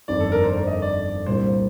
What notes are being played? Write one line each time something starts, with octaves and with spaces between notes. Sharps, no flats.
G1 F2 D#3 D5
A4
A#4
C5
D5
D#5
D5
C2 A#2 G3 C5